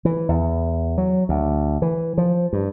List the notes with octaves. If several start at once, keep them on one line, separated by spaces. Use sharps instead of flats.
E3
E2
F#3
D2
E3
F3
G2